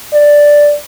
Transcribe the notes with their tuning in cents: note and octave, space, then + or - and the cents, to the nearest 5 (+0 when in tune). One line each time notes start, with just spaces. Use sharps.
D5 +0